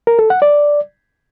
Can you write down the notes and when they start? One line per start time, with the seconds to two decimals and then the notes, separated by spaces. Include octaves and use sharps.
0.07 A#4
0.19 A4
0.30 F#5
0.42 D5